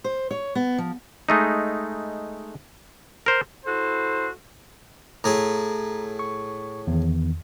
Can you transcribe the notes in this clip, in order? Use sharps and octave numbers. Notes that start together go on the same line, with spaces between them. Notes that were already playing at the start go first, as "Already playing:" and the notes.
C5
C#5
B3
F3
G#3 A3 D#4
A#4 C5
E4 F#4 A4 C5
A2 G#4 A#5
C#6
E2 D#3